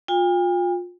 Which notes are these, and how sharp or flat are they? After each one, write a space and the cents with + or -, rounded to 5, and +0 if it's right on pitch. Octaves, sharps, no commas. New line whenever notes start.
F4 +25 G5 +45